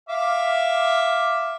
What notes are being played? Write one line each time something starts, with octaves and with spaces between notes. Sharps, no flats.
E5 F5 D6